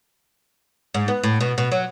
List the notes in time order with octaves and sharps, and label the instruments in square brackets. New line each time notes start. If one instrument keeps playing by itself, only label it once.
[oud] G#2
B3
A2
B2
B2
F#3